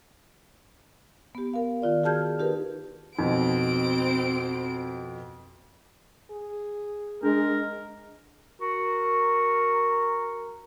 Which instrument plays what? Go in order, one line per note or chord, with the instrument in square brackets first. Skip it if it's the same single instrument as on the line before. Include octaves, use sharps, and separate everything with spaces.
[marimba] B3 G4
A#4 F5
D#3 F4 D5
F#4 G#4 A5 F6 G6 G#6
D#4 G4 A#4 B4
[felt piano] F2 B2 [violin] C4 D7 [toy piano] D#4
[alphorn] G#4
[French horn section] G#3 [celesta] D4 [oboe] A#4
[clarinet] F#4 [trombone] A#4